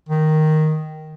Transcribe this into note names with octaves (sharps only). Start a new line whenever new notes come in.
D#3